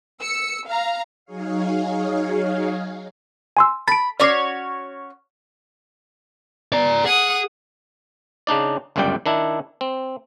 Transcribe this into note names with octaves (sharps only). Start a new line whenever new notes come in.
E6 C#7
F5 A#5
F#3 D#4 G#4 C#5 F5
G#5 C6 E6
B5 A6 D7
C#4 F#4 C#5 D5 D6 C7
D5 A#5
G#4 F#5 D#6
C#3 D4 D#4 D5
G1 C#2 F#2 G3 D5 G5
D#3 D4 E4
C4